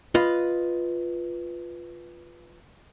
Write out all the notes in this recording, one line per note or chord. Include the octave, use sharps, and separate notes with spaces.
F4 B4 D#5